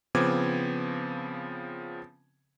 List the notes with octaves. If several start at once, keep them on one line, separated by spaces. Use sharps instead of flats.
C#3 F3 B3 C4 D6 G#6